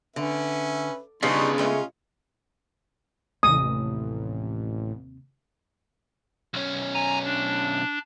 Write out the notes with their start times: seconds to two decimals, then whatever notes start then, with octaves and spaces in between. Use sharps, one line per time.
0.16 D3 C#4 B4 E5
1.23 C#3 G3 B3 D4 D#4 C6
1.58 G#3 A3 C#4 F4 D#5
3.43 A1 D#2 C3 D#6
6.54 B1 C#4
6.94 G#5 A#5
7.25 D4